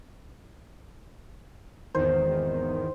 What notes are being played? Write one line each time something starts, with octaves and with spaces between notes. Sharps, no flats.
G#1 E2 D#3 C5